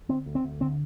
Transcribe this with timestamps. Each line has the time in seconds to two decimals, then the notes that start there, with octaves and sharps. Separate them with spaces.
0.08 D3 C4
0.26 D2
0.35 C4
0.44 D2
0.61 D3 C4